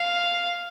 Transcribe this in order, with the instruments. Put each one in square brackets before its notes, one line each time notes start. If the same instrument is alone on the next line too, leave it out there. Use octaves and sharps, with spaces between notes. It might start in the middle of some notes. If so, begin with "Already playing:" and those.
Already playing: [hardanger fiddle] F5